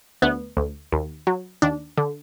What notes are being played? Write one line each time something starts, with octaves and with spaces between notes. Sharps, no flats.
D2 B3
D2
D#2
F#3
D#2 D4
D3